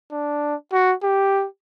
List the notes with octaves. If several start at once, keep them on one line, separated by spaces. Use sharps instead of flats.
D4
F#4
G4